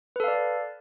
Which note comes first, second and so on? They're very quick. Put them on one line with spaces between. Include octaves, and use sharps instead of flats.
B4 A4 F5 D5